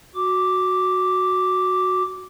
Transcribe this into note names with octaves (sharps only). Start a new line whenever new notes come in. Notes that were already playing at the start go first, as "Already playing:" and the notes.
F#4 D6